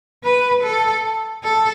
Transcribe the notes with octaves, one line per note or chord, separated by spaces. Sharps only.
B4
A4
A4